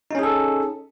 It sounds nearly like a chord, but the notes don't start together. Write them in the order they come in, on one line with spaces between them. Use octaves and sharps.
D#4 C#4 G#4 A4